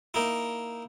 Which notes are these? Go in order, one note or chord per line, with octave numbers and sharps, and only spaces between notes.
A#3 D#4 E4